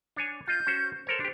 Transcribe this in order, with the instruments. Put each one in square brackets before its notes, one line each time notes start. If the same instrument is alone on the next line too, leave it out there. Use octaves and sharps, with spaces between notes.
[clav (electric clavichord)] D4 C#5 G#5
[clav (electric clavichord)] F4 D#5 [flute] G6
[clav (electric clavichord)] C#4 F#4 C5
[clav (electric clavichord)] A4 A#4 C#5 [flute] C5
[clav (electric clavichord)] D4 G4